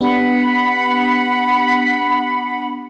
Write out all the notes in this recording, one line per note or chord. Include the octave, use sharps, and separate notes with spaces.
B3 D4 G4 F#5 B5